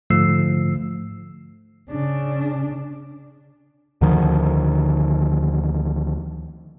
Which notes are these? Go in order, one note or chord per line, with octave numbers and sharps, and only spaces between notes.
G#2 D3 F3 A3 E6 C7
C#3 D4
D2 D3 D#3 F3